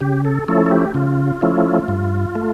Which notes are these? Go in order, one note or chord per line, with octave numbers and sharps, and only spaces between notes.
C#3 G4
A4
F3 A3 C#4 E4 A4
A4
G4
C#3 F4
F3 A3 C#4 E4
G2
A3